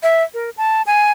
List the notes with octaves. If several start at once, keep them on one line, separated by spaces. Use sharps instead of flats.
E5
A#4
A5
G#5